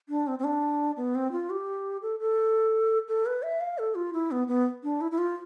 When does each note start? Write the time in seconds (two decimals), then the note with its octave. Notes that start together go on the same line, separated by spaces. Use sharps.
0.09 D4
0.27 C4
0.39 C4
0.44 D4
0.97 B3
1.15 C4
1.32 F4
1.50 G4
2.02 A4
2.20 A4
3.08 A4
3.26 B4
3.43 E5
3.61 F5
3.78 A4
3.95 F4
4.13 E4
4.31 B3
4.48 B3
4.84 D4
5.01 E4
5.11 E4
5.18 F4